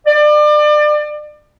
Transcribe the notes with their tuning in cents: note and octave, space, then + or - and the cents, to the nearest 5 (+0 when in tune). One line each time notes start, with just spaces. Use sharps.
D5 +30